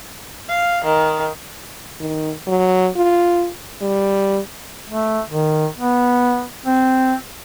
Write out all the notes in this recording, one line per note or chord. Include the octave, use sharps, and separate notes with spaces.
F5
D#3
D#3
F#3
F4
G3
A3
D#3
B3
C4